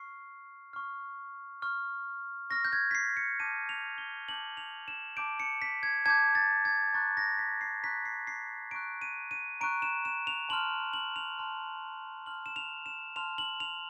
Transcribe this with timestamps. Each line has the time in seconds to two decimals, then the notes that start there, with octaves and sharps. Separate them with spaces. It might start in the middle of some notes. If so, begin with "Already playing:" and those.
Already playing: C#6 F6 C7
0.73 C#6 F6
1.62 C#6 F6
2.50 C#6 F6 A#6
2.65 G6
2.73 G#6
2.91 B6
2.95 C7
3.17 C#7
3.40 A5 D6 G6 D#7
3.69 F7
3.98 G7
4.28 A5 D6 G6 F#7
4.57 F7
4.88 E7
5.17 A5 D6 G6 D7
5.40 C#7
5.62 B6
5.83 G#6
6.06 A5 D6 G6 G#6
6.35 A6
6.65 G#6
6.94 A#5 C#6 F#6 A6
7.17 A#6
7.39 B6
7.61 C7
7.83 A#5 C#6 F#6 B6
8.05 C7
8.27 C7
8.71 A#5 C#6 F#6 D7
9.02 D#7
9.31 D#7
9.61 A#5 C#6 F#6 D7
9.82 E7
10.05 E7
10.27 F7
10.49 A5 C6 F6 F#7
10.93 F#7
11.16 F7
11.39 A5 C6 F6
12.26 A5 C6 F6 F#7
12.46 E7
12.56 F7
12.86 E7
13.16 A5 C6 F6 F7
13.38 F#7
13.60 F7